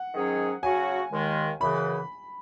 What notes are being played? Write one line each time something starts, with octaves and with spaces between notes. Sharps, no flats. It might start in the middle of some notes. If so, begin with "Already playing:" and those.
Already playing: F#5
G#2 D#3 F#3 C#4 G#4
C#3 F#3 C#4 F#4 G#5
D#2 D#3 G#3
F#2 C#3 E3 B5